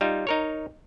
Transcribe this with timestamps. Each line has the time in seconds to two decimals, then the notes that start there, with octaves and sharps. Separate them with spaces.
0.01 G3 D#4 F4
0.27 D#4 A#4 C#5